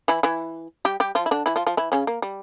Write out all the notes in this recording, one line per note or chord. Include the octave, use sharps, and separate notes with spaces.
E3 E4
E3 E4
G3 G4
G3 G4
F3 F4
E4
D3 D4
E3 E4
F3 F4
F3 F4
E3 E4
C#3 C#4
A#3
G3